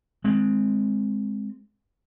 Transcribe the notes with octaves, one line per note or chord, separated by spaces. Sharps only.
G#3 C4